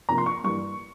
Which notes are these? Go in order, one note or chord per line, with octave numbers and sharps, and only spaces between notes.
C3 F3 A#3 A#5
C6
C#6
G2 E3 G3 A#3 C#6